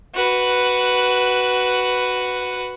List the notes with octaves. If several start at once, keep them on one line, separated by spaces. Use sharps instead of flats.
F#4 B4